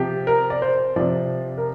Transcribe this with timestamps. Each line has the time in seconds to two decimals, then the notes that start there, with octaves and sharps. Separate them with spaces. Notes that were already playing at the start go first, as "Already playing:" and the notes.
Already playing: C3 F3 G4
0.27 A#4
0.50 D5
0.62 C5
0.96 C3 F3 D5
1.58 A#4